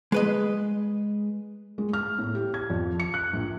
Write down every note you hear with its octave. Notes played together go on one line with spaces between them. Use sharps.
G#3 B4 D#5
G#3
F6
A2
G4
G#6
F2
C#7
F#6
A#1